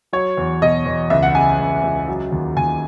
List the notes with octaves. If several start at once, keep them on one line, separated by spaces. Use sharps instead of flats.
F#3 C#5
E2
B2 D#5
E2
C#2 E5
F#5
C#3 G#5
C#2
C#2
F#3
D#2
D#2 G#5